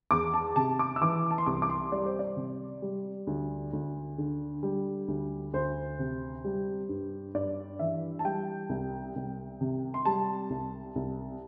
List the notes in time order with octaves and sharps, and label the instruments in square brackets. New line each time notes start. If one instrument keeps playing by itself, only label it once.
[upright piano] E2 D6
A5
C3 A5
D6
E6
E3 D6
A5
C6
C2 D6
D6
C6
G3 D5
C5
D5
C3
G3
D2
D2
D3
G3
D2
D2 C5
C3
G3
G2
G2 D5
E3 E5
A5
G3 G5
C2
C2
C3
C6
G3 A5
C2
C2